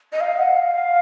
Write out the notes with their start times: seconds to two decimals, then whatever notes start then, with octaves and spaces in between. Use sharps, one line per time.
0.12 D#5
0.20 F5
0.37 F#5
0.56 F5